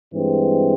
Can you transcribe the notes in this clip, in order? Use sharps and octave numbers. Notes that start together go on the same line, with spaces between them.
G2 E3 G#3 C4